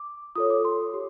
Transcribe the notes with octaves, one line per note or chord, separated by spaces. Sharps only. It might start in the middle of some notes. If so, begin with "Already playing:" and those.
Already playing: D6
F4 A4 C#5 D#6
D6
C6
G4